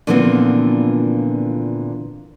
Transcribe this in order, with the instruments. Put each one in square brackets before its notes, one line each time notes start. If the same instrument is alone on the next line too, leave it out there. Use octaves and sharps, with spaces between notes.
[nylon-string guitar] A#2 D3 E3 F3 B3 C4